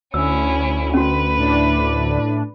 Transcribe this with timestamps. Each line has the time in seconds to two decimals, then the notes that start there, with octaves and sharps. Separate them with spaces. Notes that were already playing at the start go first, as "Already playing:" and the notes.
0.14 D2 C#4 E4 E6
0.94 C#4 F#4 B4
1.39 A2 D4